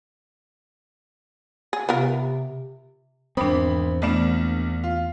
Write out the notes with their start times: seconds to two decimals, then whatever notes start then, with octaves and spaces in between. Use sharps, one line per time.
1.73 G#4
1.89 C3 B3 F4 A#4
3.37 G#1 E2 C4 D4 B5 D#6
4.02 A#1 E3 A3 B3 D5 E7
4.84 F4